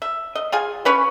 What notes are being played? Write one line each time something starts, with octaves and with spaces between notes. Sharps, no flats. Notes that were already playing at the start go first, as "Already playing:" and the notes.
E5
D#5
F4 G#4 G#5
C#4 B4 C#5